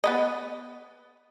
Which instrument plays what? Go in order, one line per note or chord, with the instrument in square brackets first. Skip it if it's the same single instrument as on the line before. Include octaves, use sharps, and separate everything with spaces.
[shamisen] B3 B4 D#5